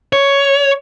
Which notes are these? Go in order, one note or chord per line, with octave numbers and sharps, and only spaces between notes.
C#5